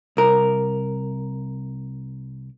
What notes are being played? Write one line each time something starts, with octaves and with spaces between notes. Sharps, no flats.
C2 A#4